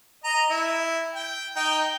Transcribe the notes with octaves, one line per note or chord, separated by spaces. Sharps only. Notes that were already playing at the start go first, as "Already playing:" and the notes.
D#5 A#5
E4
G5
D#4 G5